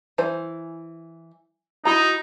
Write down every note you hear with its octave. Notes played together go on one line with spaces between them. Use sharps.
E3 C5
D#4 E4 F#4 A#5